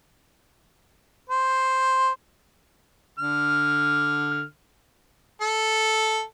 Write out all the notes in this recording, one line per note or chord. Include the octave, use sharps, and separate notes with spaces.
C5
D3 F6
A4